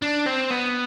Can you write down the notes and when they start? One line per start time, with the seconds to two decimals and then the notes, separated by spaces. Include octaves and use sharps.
0.02 D4
0.26 C4
0.51 B3